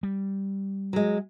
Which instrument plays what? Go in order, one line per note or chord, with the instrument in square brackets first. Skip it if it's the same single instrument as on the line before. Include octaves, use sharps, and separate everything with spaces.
[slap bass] G3
[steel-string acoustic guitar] F#3 G#3